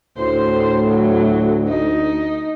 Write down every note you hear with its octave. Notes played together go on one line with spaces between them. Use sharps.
D2 A2 C5
F#3
D#4